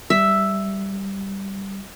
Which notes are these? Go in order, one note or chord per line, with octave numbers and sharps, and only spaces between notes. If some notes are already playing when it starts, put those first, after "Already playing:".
G3 E5